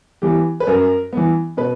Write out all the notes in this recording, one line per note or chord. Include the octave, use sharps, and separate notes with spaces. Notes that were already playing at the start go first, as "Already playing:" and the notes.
E3 B3 G4
B4
F#2 A#4
E3 B3
B2 B4